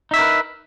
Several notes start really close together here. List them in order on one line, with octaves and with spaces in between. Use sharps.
D#4 E5 C#5 A#4 B4